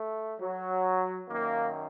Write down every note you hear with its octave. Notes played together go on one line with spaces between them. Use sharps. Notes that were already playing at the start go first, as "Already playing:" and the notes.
Already playing: A3
F#3
F#2 D#3 A#3